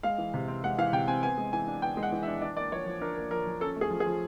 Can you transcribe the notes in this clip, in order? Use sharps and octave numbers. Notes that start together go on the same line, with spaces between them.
G#3 F5
E3
C3
C4
G#3 F#5
E3 F5
C3 G5
C4 G#5
B3 G#5
G#3
E3 G#5
D4
B3 G5
G#3
F#5
E3
E5
D4
D4 D5
A#3 D5
F3 C#5
F3
D4 A#4
A#3
F3 A#4
F3
C#4 A4
A3
G#4
F3
G#4
F3